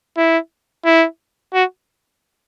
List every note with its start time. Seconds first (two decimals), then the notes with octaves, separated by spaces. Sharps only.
0.17 E4
0.85 E4
1.53 F#4